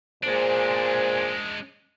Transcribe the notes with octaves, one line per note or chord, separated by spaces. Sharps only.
A#2 G#3 D4 G#4 C5